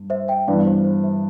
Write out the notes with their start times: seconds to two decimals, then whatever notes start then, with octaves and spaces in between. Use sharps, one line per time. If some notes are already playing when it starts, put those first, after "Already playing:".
Already playing: G2
0.10 C5 E5
0.28 E5 G5
0.48 G2 E3 B3 D5 F5
0.66 C5
0.84 C5
1.03 C5 E5